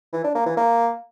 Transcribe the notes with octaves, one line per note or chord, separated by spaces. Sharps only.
E3
D4
A#3
E3
A#3